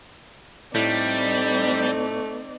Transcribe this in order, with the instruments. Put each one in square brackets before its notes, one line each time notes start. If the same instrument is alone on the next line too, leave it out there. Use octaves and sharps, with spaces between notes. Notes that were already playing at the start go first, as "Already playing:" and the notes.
[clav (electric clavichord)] A2 [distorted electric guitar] G3 [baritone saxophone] A3 [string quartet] C4 D#4 D5